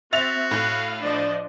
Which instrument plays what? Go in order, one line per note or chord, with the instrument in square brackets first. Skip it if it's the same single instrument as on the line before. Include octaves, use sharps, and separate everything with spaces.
[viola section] C4 [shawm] F#4 [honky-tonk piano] E5 A6 F7
[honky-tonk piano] A2 F#6 [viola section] F5
[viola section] F3 D4 D#5 [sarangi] D5